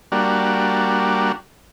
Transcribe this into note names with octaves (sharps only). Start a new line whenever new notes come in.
G3 A#3 D4 F#4